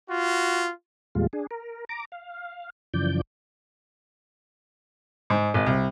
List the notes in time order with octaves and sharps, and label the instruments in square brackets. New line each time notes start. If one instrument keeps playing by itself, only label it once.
[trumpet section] F4 F#4
[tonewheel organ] E2 A#2 G3 G#3 F4
D4 G#4
A#4
A#5 D6
F5
F#2 C#3 E3 F3 D5 G6
[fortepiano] G#2
G#1
C2